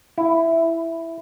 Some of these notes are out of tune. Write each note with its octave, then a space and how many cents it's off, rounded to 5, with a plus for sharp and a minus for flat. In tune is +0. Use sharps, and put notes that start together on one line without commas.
E4 +5